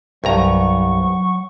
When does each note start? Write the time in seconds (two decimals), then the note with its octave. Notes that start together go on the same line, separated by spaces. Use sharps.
0.24 C2 G2 F#3 F#5 A#5 C#6